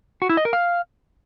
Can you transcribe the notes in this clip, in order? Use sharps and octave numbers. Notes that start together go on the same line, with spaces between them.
F#4
E4
D#5
A#4
F5